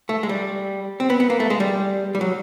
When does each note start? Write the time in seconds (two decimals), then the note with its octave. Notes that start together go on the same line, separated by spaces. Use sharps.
0.09 A3
0.23 G#3
0.29 G3
1.00 C4
1.10 B3
1.20 B3
1.30 A#3
1.40 A3
1.50 G#3
1.60 G3
2.15 G3
2.21 F#3